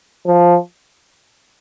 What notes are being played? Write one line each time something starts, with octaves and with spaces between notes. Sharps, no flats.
F3